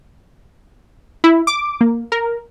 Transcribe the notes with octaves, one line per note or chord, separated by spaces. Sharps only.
E4
D6
A#3
A#4